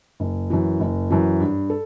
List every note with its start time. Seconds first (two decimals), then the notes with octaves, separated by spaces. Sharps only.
0.20 F#1
0.50 F#2 E3
0.80 F#1
1.10 F#2 E3
1.40 G2
1.70 A4